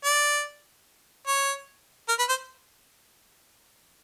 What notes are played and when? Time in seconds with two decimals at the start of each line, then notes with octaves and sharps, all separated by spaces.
0.05 D5
1.27 C#5
2.09 A#4
2.19 B4
2.29 C5